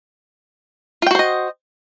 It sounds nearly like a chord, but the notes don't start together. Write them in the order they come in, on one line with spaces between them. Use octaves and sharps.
F4 G5 F#4 C5 D#5